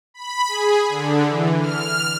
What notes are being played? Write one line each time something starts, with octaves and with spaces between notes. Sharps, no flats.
B5
G#4
D3
E3
F6